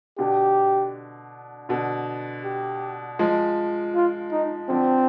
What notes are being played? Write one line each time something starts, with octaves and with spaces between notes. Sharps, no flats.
B2 D3 G4
B2 D3
G4
F3 G#3
F4
D#4
D3 F3 C4